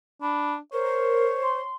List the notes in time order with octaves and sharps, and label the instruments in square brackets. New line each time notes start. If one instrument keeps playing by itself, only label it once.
[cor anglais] D4 [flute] B5
[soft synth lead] A#4 [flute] C5 [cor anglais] C#5
[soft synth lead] C6